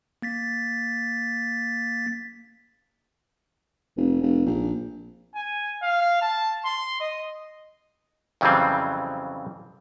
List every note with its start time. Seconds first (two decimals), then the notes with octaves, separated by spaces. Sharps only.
0.22 A#3 A6 B6
3.97 F1
4.22 F1
4.46 A#1
5.35 G#5
5.82 F5
6.22 A5
6.65 C6
7.00 D#5
8.41 F2 C#3 E3 F#3 G3 C4